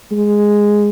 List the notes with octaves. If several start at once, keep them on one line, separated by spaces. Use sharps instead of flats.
G#3